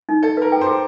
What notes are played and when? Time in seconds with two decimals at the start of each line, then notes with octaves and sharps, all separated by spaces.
0.09 D#4
0.23 A4 D5
0.37 A#4 B4
0.52 G5
0.61 C5
0.67 G#4